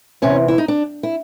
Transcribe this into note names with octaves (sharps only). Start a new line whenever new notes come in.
E2 C3 E3 C#4
E4
D#4
D4
E4